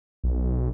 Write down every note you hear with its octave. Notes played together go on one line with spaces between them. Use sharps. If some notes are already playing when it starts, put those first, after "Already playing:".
B1